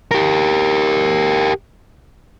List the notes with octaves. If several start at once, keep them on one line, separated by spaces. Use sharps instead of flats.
G4 A#4